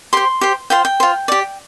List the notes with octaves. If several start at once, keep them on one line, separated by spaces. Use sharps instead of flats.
G4 C5 C6
G4 C5
F4 C5 G5
G5
F4 C5
G4 D5